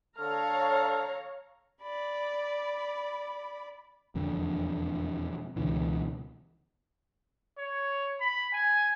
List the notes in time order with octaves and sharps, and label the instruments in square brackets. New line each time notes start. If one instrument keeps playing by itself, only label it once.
[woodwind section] D3 F6 [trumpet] A4 [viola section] C#5 F5 A#5
[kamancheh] D5 B5
[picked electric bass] E1 F2 D3
C#2 B2 D3 E3
[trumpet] C#5
B5
G#5